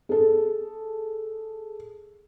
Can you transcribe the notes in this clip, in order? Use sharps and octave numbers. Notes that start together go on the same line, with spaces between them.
G#4 A4